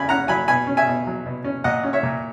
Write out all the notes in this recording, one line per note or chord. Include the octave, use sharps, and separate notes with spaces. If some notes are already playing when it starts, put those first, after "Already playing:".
Already playing: F#2 C#3 G#5 B5
C#4 F#5 A#5
F#3 G#5 B5
B2 G#5 B5
C#4
E5 G#5
B2
F#3
B2
C#4
A#2 D#5 F#5
C#4
C#5 E5
A#2